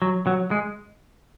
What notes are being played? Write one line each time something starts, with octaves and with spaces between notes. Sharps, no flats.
F#3
F#3
G#3